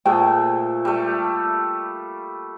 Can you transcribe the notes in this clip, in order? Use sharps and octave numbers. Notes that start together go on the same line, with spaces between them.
A#2 A3 G#4 C5 G5
G3 A3